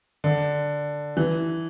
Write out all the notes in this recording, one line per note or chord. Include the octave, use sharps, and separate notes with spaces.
D3
E3